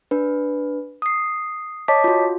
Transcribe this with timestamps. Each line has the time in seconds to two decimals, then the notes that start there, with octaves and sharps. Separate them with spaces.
0.11 D4 B4
1.02 D#6 C7
1.88 C#5 D#5 A5 D6 B6
2.04 F4 F#4